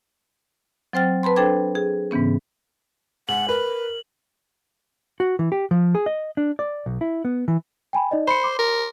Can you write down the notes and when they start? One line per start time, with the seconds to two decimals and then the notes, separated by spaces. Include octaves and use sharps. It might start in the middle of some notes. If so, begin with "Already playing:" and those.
0.93 F#3 C4 C5 G5 F6 A6
1.23 B4 A5 B5 C6
1.36 D4 A4 C5 G5 D6 G#6
1.75 G#4
2.11 G#2 C#3 E3 B3 C#4
3.29 G#2 F#5 F#7
3.49 A#4 B4
5.20 F#4
5.39 E3
5.52 G4
5.71 F3
5.95 G#4
6.06 D#5
6.37 D4
6.59 D5
6.86 B1
7.01 E4
7.25 B3
7.48 E3
7.93 G5 G#5 B5
8.11 D#4 D5 D#5
8.27 C5 B5 C#7
8.44 C6 D6
8.59 A#4